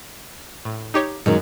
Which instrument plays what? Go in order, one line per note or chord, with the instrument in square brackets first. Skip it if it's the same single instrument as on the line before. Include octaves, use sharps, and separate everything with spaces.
[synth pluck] A2
D#4 G4 C#5
[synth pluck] F#2 [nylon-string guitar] D#3 F#3 G#3